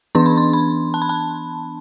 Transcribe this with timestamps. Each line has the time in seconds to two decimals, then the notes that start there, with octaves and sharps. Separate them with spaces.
0.15 E3 B3 D4 C6
0.26 B5
0.37 C6
0.53 B5
0.94 A5
1.02 B5
1.09 A5